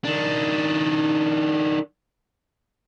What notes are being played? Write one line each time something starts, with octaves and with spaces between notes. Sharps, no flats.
D#3 D4